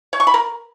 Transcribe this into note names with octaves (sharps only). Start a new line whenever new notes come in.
C#5
C#6
B5
A#4